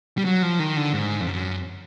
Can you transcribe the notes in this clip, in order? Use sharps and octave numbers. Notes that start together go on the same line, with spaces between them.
G3
F#3
F3
D#3
D3
G#2
F2
F#2